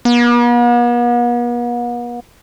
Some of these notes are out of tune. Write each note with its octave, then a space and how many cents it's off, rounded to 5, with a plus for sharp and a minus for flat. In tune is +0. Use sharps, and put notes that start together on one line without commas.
B3 -45